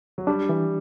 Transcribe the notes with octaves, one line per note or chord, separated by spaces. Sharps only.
F#3
G3 D4
E3